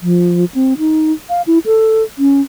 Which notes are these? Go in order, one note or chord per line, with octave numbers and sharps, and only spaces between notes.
F3
C4
D#4
F5
E4
A4
C#4